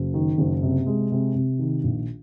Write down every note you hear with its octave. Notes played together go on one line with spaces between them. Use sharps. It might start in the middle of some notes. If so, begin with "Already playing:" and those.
Already playing: F#1
D#3
F#1
C3
G#3
C3
C3
D#3
A#1